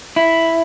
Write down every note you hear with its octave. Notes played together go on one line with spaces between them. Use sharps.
E4